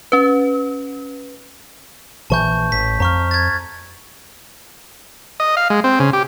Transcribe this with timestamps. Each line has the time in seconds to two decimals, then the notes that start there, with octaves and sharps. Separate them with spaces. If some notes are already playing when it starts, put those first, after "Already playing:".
0.12 C#4 B4
2.30 A#1 E3 A5 C#6 G6
2.72 A1 B6
3.00 F2 A#5 C#6 F6
3.31 G#6 A6
5.40 D#5
5.57 F5
5.70 G#3
5.84 C4
5.99 C#3
6.13 G4